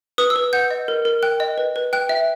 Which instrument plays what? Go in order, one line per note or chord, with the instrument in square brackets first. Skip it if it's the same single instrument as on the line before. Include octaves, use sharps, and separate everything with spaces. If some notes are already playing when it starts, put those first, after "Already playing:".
[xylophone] B4 D#6
E6
B4
F#5 G6
D#5
A#4
A#4
G5 F#6
D#5
B4
B4
G5 F#6
E5